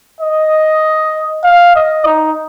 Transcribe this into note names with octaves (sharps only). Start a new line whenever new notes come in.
D#5
F5
D#5
D#4